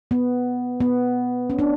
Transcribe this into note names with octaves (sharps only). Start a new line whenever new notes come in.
B3
B3
C#4
D4